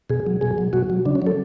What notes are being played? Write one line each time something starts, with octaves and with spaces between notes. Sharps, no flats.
B2 G#4
F#3
B2 G#4
F#3
B2 F#4
F#3
C#3 D4
C#4
F#3 A4